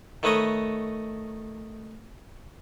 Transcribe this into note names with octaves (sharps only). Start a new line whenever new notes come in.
D#3 A3 B4 C#5 D#5